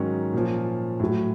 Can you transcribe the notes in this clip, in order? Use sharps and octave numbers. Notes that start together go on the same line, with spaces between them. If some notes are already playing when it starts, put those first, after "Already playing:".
Already playing: G#2 D#3 F#3 C#4
A#2 F3
A2 F#3